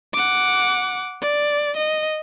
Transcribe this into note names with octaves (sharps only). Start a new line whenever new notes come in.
F#5 D6
D5
D#5